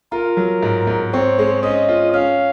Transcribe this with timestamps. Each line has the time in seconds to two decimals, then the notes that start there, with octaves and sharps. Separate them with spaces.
0.12 F4 A#4
0.37 F#3
0.63 G#2
0.87 G#2
1.13 C4 C#5
1.38 G#3
1.63 C#4 D#5
1.88 F4
2.14 C#4 F5